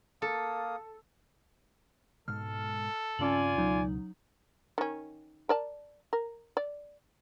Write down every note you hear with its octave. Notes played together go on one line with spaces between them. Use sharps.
A#3 A4 F5 D#6
G#2 B2 G#3 A4 F6
G2 C#3 C4 C#4 F4 D5 G#5 F#7
C#2 B2 F#3 D#4
D#3 C#4
A#4 D5 A5
A#4
D5